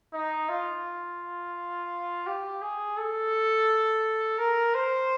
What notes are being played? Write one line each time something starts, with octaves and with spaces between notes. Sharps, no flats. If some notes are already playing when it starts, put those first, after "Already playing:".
D#4
F4
G4
G#4
A4
A#4
C5